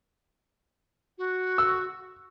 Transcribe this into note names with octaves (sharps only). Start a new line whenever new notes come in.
F#4
E6